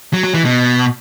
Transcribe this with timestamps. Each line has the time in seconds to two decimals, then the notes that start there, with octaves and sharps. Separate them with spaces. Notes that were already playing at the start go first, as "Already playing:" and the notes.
0.13 F#3
0.24 F#3
0.34 E3
0.45 B2